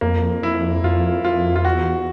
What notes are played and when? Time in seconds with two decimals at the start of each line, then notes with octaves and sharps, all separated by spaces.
0.01 F2 A#3
0.42 F2 E4
0.84 F2 F4
1.24 F2 F4
1.56 F4
1.65 E2 F#4